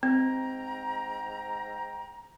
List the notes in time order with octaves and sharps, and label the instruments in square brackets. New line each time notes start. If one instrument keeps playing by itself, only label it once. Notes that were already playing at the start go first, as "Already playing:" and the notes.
[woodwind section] G#2 G5 A#5 [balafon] C4